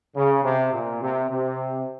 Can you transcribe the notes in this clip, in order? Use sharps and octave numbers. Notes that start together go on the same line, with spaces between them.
C#3
C3
A#2
C3
C3